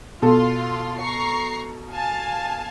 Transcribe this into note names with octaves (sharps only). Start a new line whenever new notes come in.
B2 F4 A4 C6
A#5 C#6 C7
F5 G#5 A5